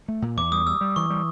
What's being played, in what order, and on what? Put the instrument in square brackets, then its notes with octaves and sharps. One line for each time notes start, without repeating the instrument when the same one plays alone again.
[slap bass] A3
A#2
[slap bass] E2 [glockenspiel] D6
[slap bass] G3 [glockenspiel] D#6
[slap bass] G3 [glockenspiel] E6
[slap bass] G3
[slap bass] E3 [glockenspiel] C#6
[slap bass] G3